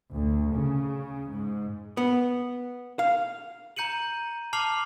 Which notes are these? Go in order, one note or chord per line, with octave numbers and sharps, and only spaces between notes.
D2
C#3
G#2
B3
F5
A#5 G6 C#7 D#7 F#7
A5 D6 F6 C7 F7 F#7